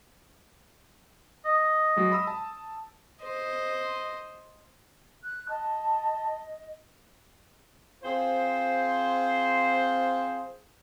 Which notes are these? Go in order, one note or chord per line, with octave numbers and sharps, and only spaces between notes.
D#5
F#3 G#3
B5 D#6 E6
A5
C5 D#5
F#6
D#5 A5
C4 F4 G#4 C5